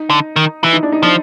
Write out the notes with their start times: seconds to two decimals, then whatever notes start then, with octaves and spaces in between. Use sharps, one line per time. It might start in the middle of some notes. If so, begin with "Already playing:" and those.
Already playing: D#4
0.10 D3
0.36 D#3
0.63 E3 E4
0.73 D#4
0.83 D4
0.92 D#4
1.03 F3 D4